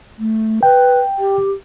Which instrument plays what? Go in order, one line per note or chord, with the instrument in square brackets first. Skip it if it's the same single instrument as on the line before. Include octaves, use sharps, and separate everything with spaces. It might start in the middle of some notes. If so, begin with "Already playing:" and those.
[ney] A3
[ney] B4 [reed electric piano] G5
[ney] G4